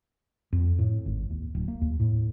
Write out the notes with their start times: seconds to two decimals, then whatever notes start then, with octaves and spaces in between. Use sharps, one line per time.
0.53 F2
0.79 A2
1.06 G#1
1.31 D#2
1.55 D1
1.68 A#3
1.82 D#2
2.00 A2